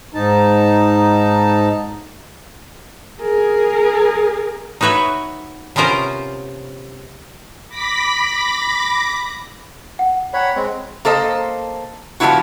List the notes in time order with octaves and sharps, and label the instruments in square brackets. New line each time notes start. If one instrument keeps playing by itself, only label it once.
[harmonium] G#2 D#4 A5
[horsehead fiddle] G#4 A#4
[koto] D#4 F#4 B4 C#5 E5
C3 B3 C#4 F4 A#4 C5
[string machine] B5 D6 A#6 B6
[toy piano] F#5
[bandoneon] C#5 F#5 B5 [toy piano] D5 G5 A#5
[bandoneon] G#3 C4
[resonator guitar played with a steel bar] A#3 A4 C5 D#5
F3 G3 A#3 B3 E4 F#4